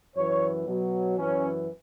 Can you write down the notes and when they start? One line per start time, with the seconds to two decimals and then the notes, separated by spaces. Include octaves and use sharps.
0.16 F#2 E3 C#5
0.66 B2 F#3
1.17 F#2 E3 C#4